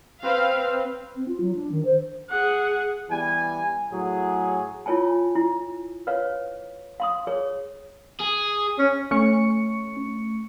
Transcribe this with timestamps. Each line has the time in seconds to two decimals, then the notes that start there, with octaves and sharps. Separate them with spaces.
0.23 C4 B4 F5
1.16 C4
1.28 F4
1.41 F#3
1.55 D4
1.72 D#3
1.85 C5
2.30 G#4 F#5
3.10 E3 G3 B3 G#5
3.91 A2 F#3 G#4
4.86 E4 F4 C#5 G#5 A5
5.36 E4
6.07 B4 C#5 F5
7.00 F5 C6 D#6
7.27 G#4 C#5
8.20 G#4
8.79 C#4
9.11 A3 C#4 C#6 C#7